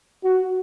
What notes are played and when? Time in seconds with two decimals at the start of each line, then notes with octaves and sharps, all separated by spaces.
0.24 F#4